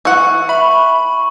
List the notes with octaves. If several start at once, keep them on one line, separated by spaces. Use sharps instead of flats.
E3 F#5 C#6
E5 B5